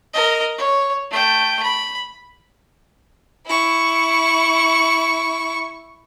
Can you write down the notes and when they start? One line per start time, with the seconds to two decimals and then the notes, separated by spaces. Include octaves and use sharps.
0.13 A#4 D#5
0.58 C#5
1.11 A3 G5
1.62 B5
3.47 E4 C#6